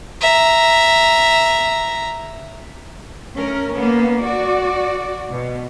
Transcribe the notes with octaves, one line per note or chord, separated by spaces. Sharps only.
E5 A#5
A3 C#4 A#4
A#3 B3 C#4
F#4 D5
B2